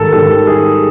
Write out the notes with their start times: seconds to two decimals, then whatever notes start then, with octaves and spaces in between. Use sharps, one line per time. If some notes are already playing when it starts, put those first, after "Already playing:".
Already playing: G#2 D#3 G3 A4 A#4
0.12 G#2 D#3 G3 A4
0.47 G#4